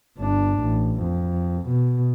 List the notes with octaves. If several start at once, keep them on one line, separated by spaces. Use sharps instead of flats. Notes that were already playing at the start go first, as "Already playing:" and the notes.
G1 D4
A1
F2
B2